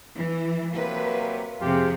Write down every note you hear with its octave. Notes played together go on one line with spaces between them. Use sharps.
E3
C3 F#3 A#3 B4
F2 C3 F4 G4 G#4